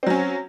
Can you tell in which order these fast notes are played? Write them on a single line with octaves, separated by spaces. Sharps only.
C4 F#3 C#4